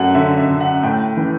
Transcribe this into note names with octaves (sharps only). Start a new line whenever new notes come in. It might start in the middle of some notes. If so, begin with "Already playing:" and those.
Already playing: F#2 A3 F#5
D3 E5
E5
D3
F#5
A2 G5
E3